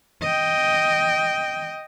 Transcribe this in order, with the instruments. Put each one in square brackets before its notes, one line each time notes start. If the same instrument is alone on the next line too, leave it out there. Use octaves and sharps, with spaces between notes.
[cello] D#5 G5